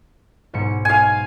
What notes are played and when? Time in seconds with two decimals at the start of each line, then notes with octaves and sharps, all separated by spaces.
0.53 B1 G#2 C#7
0.85 F5 G#5